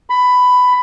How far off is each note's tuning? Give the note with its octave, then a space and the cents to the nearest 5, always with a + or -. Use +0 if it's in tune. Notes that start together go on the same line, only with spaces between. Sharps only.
B5 +15